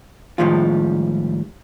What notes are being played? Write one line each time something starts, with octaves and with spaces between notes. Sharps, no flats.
A2 D#3 F3 G3 G#3 F4